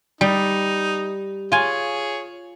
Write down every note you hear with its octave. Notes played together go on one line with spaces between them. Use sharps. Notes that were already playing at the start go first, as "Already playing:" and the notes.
G3 D#4
F4 G#4 C#5 G#5